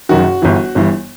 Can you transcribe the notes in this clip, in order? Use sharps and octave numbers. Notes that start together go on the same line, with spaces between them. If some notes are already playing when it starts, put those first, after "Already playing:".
F#1 F#2 D#3 F#4
G1 G2 E3
G1 G2 E3